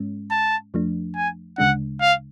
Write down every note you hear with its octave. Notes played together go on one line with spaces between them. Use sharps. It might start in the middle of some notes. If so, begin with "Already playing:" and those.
Already playing: G#2 G#3 C#4
A5
F2 F3 A3 D4
G#5
D2 C#3 G#3 D4 F#5
F5